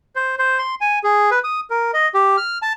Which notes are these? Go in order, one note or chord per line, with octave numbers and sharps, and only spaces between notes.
C5
C5
C6
G#5
G#4
B4
D#6
A#4
D#5
G4
F6
A5